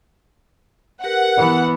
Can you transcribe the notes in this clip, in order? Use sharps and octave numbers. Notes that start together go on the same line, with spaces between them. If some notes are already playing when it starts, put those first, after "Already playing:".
G4 A#4 B4 F#5
E3 B3